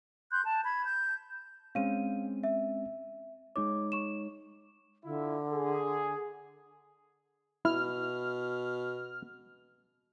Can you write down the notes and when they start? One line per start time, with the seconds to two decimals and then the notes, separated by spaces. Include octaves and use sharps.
0.31 C6 F#6 G6
0.44 A5
0.65 B5 G#6
0.86 G6
1.75 G#3 C4 C#4 F5 D#7
2.44 E5
3.56 G#3 D#4 C#5 D6
3.92 C#6 E7
5.05 D3 E4 F4 E5
5.53 G#4
7.65 B2 E4 F6